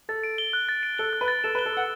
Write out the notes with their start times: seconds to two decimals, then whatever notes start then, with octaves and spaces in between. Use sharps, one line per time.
0.09 A4 A6
0.24 D7
0.38 G7
0.53 F#6
0.69 A6
0.83 D7
0.98 A4 G7
1.13 F#6
1.21 B4
1.28 A6
1.44 A4 E7
1.55 B4
1.59 G7
1.66 A4
1.73 F#5 E6